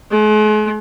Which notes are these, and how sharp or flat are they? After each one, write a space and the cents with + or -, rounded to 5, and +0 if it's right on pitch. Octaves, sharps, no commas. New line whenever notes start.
G#3 +45